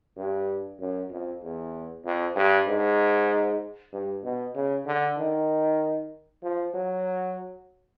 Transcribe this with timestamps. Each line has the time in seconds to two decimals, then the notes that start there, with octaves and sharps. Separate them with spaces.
0.17 G2
0.79 F#2
1.11 F2
1.43 E2
2.05 F2
2.36 G2
2.67 G#2
3.93 G2
4.24 B2
4.55 C#3
4.86 D3
5.18 D#3
6.43 F3
6.74 F#3